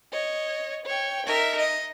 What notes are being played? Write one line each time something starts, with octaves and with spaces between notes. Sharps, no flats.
C#5 D#5
C#5 G5
D#4 A#4 E5
D#5